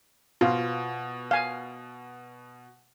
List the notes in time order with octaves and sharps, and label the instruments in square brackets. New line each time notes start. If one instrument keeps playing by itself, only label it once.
[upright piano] B2 [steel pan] F4
[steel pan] F5 G#5